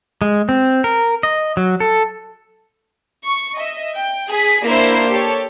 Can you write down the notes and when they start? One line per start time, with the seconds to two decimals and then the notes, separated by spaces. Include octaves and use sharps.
0.22 G#3
0.49 C4
0.84 A#4
1.23 D#5
1.57 F#3
1.80 A4
3.26 C#6
3.56 D#5 E5
3.95 G5
4.30 G#4 B6
4.65 A#3 D4 E4 C5 C7
5.10 G4 A4 C#5